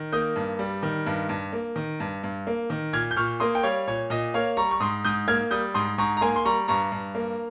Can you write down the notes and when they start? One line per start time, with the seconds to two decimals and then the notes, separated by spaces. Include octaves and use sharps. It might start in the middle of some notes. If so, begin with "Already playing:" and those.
Already playing: D#3
0.12 A#3 D#6 G6
0.36 G2
0.59 G3
0.83 D#3
1.07 G2
1.29 G2
1.53 A#3
1.76 D#3
2.00 G2
2.24 G2
2.47 A#3
2.70 D#3
2.93 A#2 F6 G#6
3.11 G6
3.16 A#2 C#6 F6
3.40 A#3 C6 D#6
3.55 G5
3.63 G3 C#5 F5
3.87 A#2 C#5
4.10 A#2 D#5
4.34 A#3 C#5 F5
4.57 G3 A#5 C#6
4.71 C#6
4.80 G#2 C6 D#6
5.05 G#2 D#6 G6
5.28 A#3 F6 G#6
5.51 G3 D#6 G6
5.74 G#2 C6 D#6
5.98 G#2 A#5 C#6
6.17 A#5
6.21 A#3 G#5 C6
6.36 C6
6.45 G3 A#5 C#6
6.68 G2 A#5 C#6
6.92 G2
7.15 A#3